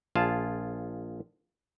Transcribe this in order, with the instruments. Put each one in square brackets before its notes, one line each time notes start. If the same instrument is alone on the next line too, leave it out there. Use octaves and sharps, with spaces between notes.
[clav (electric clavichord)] A#1 F4 G#4 A5